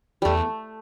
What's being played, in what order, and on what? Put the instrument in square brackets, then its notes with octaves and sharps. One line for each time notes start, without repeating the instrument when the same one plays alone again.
[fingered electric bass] E2 [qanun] G3 A3